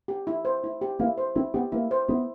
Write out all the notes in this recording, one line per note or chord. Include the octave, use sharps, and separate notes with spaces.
G4
E4
C5
E4
G4
A#3 E4
C5
C4 E4
B3 G4
A#3 E4
C5
B3 E4